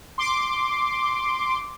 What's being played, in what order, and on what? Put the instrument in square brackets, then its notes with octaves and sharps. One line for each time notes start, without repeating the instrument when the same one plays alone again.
[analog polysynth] C6 D6